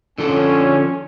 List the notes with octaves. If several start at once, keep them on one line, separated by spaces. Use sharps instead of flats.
D3 F3 C#4 A4